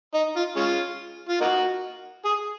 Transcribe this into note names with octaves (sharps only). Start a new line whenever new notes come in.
D#4
F4
G#3 C#4 F4
F4
A#3 D#4 F#4
G#4